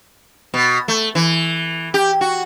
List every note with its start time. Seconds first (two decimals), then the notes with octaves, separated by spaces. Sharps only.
0.54 B2
0.88 A3
1.15 E3
1.94 G4
2.21 F#4